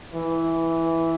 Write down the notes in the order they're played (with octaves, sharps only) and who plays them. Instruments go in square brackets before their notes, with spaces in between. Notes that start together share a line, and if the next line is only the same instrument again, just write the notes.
[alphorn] E3